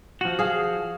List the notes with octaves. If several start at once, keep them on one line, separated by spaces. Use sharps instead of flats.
F3 F#4
G#4 F5